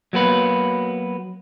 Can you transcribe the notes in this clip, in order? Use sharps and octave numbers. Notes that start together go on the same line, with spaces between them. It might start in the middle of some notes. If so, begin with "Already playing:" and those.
F#3 A#3 B3 B4